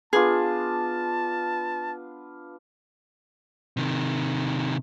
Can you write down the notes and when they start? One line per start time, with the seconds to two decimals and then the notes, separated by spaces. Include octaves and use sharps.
0.13 B3 D4 F4 G#4 A5
3.77 C3 D#3